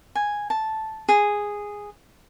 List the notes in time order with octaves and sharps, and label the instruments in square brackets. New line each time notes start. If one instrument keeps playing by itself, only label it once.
[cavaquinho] G#5
A5
G#4